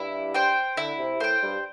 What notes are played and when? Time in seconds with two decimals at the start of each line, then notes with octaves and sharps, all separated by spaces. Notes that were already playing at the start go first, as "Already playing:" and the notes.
Already playing: G2 G3 E4
0.34 C5 G5
0.77 D3 E4
0.98 C3
1.20 A2 A3 C5 G5
1.42 G2 G3